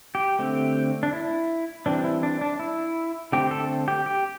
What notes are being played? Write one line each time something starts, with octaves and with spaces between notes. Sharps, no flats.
G4
D3 A3 C4
D4
E4
E3 G3 C4 D4
E4
D4
D4
E4
D3 A3 C4 G4
A4
G4
G4